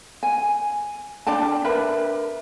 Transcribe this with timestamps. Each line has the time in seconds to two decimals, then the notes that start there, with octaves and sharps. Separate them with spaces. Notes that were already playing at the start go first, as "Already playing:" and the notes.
0.23 G#5
1.27 D4 D5 G5 A5
1.65 A#4 B4 E5 B5